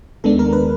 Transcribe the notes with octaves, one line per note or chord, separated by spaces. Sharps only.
D#2 D#3 G#3 B3 D4 A4
A#4
B4